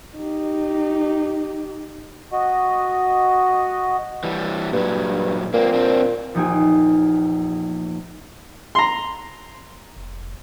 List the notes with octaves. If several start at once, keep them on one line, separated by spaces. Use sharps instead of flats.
D#4 G4
F#4 D#5
E3 G3
G2 A#2 F#3
A#2 A#3 C4
C4 D4
A#1 E2 F3 D#4 G4 G#5
A#5 C6
F1